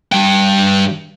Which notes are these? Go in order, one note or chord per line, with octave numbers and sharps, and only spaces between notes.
G2 G5